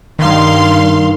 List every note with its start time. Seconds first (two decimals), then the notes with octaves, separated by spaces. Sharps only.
0.19 G2 D#3 F5 C6